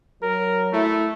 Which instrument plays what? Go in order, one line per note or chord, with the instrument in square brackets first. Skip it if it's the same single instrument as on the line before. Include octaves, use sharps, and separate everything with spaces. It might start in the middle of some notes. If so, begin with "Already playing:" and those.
[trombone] F#3 [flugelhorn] A#4
[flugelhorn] A3 [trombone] E4